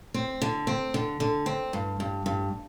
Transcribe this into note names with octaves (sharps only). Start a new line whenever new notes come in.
C4
D3
C4
D3
D3
C4
G2
G2
G2